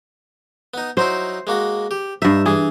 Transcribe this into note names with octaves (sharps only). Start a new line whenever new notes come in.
B3 D#4
F#3 D#4 E4 C5
G#3 A#3 F#4
G4
G2 D#4 E5
E3 G#4